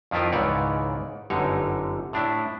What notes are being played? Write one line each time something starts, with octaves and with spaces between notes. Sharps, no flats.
F2 D#3 F3 E4 F4 A#4
C#2 G#2 D#3 E3 C#5 D5
G1 F#2 D3 D#4 C#5
A2 D4 E4